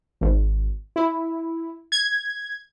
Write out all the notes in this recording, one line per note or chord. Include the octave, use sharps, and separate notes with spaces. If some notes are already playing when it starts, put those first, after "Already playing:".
G#1
E4
G#6